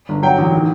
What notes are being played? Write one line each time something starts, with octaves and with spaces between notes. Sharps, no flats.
G1
F#3 G5
A1 F#5
D#3